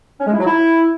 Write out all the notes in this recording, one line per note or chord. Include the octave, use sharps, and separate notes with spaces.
C#4
G#3
E4
F#3
E4